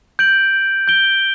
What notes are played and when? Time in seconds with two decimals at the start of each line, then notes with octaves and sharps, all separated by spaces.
0.19 G6 D7 F#7
0.88 G6 D7 G7